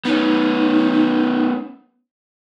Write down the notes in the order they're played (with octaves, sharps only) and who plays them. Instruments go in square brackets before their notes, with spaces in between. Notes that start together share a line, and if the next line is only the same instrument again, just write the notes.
[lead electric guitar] B3 C#4 [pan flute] D#4